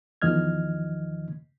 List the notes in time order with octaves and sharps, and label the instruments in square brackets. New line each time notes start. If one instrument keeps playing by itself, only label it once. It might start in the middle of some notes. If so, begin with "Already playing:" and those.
[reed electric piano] E2 D#3 F3 D#5 F6 G#6